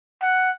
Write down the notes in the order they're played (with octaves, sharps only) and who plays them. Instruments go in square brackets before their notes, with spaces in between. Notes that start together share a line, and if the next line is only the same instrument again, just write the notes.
[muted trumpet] F#5